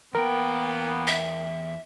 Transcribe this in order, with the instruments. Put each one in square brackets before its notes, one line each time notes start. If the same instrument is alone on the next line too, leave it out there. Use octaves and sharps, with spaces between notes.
[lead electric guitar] E2 G5 [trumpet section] A#3 B3 [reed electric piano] A#4
[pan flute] E5